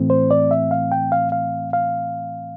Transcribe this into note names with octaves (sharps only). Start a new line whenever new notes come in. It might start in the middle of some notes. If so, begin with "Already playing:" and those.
Already playing: A2 E3 A3 C4
C5
D5
E5
F5
G5
F5
F5
F5